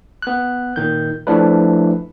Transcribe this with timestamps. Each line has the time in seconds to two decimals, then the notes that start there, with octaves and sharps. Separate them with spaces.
0.22 B3 F#6
0.76 A#2 D#3 G6
1.27 F3 A3 D4 E4 B4